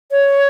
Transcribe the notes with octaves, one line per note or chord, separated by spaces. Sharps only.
C#5